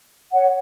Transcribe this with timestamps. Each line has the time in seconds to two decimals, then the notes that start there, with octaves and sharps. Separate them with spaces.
0.32 C#5 F#5